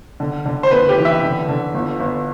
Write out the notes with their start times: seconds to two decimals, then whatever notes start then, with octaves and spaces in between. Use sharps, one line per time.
0.20 D3
0.46 D3
0.63 C5
0.71 F#1 B4
0.89 G4
0.98 E3
1.05 E5
1.23 D3
1.49 D3
1.74 G1
2.00 G1